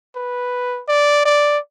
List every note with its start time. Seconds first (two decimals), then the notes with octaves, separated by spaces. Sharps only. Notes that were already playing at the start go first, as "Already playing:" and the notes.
0.16 B4
0.88 D5
1.25 D5